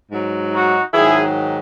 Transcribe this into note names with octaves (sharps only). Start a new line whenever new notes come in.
G#2 F#3
D#4 F#4
G#2 D#3 F#3 E4 G#4